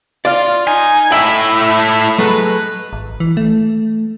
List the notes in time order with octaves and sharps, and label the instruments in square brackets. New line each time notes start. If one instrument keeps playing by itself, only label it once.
[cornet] F4 [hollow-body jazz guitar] D5 F5
[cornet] D#4 [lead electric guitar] G#5
[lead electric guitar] A2 E4 [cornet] E5 [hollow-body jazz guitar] G5
[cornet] E5
[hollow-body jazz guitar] F#3 G#3 A3 [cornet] B4
[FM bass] G#1
E3
A3